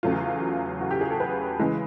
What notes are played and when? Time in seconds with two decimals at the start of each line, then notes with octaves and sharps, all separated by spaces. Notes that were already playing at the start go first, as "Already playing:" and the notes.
0.03 E2 C#3 F#3 A3 F4
0.81 F#4
0.91 G4
1.01 G#4
1.11 A4
1.20 B4
1.59 C#3 E3 G#3